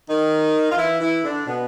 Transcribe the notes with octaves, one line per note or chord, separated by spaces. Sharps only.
D#3 D#4
F4
E3 E4
E3 E4
D3 D4
B2 B3